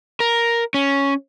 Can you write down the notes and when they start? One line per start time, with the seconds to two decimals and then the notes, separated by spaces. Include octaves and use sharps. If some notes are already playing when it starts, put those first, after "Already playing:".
0.20 A#4
0.74 C#4